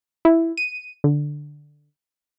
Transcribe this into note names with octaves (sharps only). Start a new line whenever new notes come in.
E4
D#7
D3